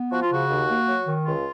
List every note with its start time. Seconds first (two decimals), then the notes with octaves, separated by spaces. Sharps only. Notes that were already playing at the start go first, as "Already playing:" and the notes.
Already playing: B3
0.12 F3 F#4
0.22 F4
0.31 C#3 F#4
0.50 D#2
0.69 A#3
0.88 F#3
1.07 D#3
1.26 C#2 F4